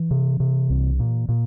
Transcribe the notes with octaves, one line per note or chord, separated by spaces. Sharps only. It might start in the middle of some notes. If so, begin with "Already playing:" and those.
Already playing: E3
C3
C3
C2
A#2
A#2